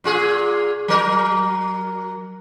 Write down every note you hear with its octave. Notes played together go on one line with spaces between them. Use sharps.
A#2 F4 G#4
F#3 A#4